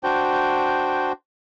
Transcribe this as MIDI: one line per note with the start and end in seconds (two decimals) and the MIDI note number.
0.04 1.12 62
0.04 1.12 66
0.04 1.12 72
0.04 1.12 79